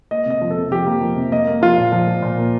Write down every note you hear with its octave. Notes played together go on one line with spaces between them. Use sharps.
A#3 D#5
C3 D#5
F3
A4
C3
F3 G4
A#3
F3
C3
A#3 D#5
A#3
F3 F4
A#2
F3
F3
A#2
A#3